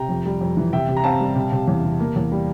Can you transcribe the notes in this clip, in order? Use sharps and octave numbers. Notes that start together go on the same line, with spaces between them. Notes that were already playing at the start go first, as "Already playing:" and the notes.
Already playing: C3 G5 A#5
F2
G3
F2
E3
C3 E5 G5
C3
A#5
C4 F5 A5
G3
C3
C3
E2
C3
A#3
E2
G3